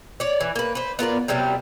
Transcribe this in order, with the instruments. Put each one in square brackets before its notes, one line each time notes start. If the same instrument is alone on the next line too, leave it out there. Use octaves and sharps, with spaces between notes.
[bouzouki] C#5 D5
E3
A#3 B4
B4 C5
B3 F4 A#4 D5
C3 F#3 G3 B3